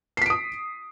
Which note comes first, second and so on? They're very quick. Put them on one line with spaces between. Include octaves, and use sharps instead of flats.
C7 B6 D7 D#6